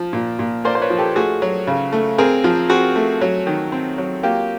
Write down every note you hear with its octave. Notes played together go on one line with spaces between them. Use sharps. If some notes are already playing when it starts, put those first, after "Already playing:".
Already playing: F3
A#2
A#2
A#3 C5 D5
C5
B4 C#5
F3
G4 A4
A3 F#4 G#4
F#3
C#3
A3
C4 G#4 A#4
F3
C4 F#4 G#4
A3
F#3
D#3
C4
F#3
A#3 F4 G4